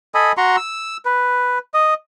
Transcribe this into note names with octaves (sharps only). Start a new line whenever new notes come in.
A4 D#5 G#5 B5
F#4 A#5 C6 C#6
E6
B4
D#5